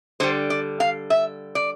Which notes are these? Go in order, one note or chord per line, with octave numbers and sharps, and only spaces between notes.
D3 G3 C5
D5
F5
E5
D5